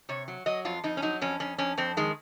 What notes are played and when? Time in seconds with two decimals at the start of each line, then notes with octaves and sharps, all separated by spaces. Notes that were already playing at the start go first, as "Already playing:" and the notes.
0.09 C3 C#5
0.28 F#3
0.46 F#3 D#5
0.65 F2 F4
0.84 F2 D#4
0.97 C#4
1.02 F#3 D#4
1.21 F2 C#4
1.40 F2 C#4
1.58 F2 C#4
1.77 F2 C4
1.97 D#3 G#3